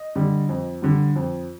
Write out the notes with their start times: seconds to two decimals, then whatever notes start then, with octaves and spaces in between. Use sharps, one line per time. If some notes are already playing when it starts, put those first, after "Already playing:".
Already playing: D#5
0.15 D3 G3
0.49 F2
0.82 D3 G3
1.16 F2